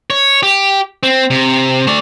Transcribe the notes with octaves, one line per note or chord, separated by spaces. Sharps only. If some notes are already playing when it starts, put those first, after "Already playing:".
C#5
G4
C4
C3
A3 D5